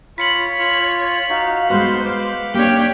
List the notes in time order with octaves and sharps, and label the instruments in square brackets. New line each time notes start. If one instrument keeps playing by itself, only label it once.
[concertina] F4 B5 [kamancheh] C#5 [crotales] B6 C#7 F#7
[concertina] F4
[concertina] D#4 F#4 [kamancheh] F5
[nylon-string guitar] G#3 B3 F#4 [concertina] B4 F5 C6 [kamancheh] C5
[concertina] F5 D6
[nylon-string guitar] A#3 C4 D4 [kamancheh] G4 C#5